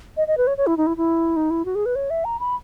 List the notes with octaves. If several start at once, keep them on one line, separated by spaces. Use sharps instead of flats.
D#5
D#5
B4
C#5
C#5
E4
D#4
E4
E4
D#4
E4
F#4
G#4
B4
C#5
E5
A#5
B5